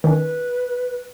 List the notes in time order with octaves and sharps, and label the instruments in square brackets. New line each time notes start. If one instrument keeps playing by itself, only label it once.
[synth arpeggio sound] D#3 C#4 [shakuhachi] B4